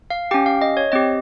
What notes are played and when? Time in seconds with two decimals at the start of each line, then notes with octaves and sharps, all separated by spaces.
0.10 F5
0.31 C#4 G4 G5
0.46 F5
0.62 D#5
0.77 C#5
0.92 C4 G4 D#5